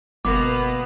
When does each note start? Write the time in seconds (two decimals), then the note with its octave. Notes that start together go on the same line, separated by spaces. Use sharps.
0.25 G1 B2 A#3 B3 D6